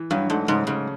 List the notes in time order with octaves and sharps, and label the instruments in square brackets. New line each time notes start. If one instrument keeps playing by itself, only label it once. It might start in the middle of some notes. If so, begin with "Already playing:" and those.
Already playing: [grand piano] E3
[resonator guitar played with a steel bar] G2 [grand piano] F#3
[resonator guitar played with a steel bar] G#2 [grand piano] A3
[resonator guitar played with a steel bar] G#2 [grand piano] C#3
[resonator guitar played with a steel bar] G#2 [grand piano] C#3